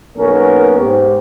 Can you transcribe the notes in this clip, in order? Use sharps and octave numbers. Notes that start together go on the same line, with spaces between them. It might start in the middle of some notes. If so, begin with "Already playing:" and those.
B1 A#3 B3 C#4 A#4
G#2 G4